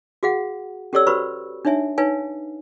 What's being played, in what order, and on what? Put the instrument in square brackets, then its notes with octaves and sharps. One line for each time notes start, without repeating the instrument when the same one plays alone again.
[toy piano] F#4 G#4 F5 F#5
C#4 G4 A4 C#5 D5 E6
F#4 B4 C5 B5 C#6
D4 D#4 C#5 E5 G#5
D#4 B4 C#5 F5 G#5